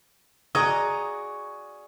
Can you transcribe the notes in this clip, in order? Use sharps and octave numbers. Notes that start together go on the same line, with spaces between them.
F#4 G#4 D5 D#5 A#5 C#6 D#6 G#6